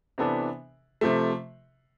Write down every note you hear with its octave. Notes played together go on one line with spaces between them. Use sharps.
C3 E3 B3 D4 A4
C3 F3 A3